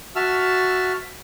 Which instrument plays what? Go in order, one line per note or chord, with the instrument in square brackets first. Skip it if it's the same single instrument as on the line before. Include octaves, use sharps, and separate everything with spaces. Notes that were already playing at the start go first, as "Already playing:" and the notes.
[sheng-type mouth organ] F#4 E5 A5 E6 F6